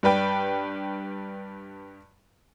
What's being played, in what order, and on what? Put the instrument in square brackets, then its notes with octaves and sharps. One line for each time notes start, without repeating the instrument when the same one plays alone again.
[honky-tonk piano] G2 D4 B4 G5